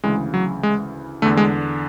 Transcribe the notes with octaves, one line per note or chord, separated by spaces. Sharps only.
D2 C#3 E3 G#3
F#3
G#3
E2 D3 A3
G#3